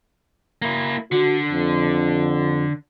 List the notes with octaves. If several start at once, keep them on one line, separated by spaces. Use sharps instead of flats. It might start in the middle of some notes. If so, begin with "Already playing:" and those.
A#3 E4
D3 F#4
F2